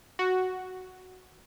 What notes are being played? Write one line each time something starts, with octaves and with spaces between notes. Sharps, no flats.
F#4